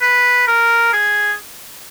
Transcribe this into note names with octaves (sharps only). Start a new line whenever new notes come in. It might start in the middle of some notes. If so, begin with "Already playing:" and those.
B4
A#4
G#4